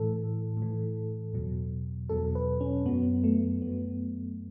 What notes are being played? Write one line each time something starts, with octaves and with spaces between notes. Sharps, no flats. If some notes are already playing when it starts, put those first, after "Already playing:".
Already playing: A2 E3 A4
A2 E3
E2 B2 F#3
E2 B2 F#3 A4
B4
C#4
F#2 F#3 B3
A3
F#2 B3
F#3